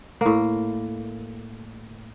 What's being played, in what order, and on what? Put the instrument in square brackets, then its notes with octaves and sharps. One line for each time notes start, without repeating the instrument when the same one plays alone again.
[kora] A2 A#3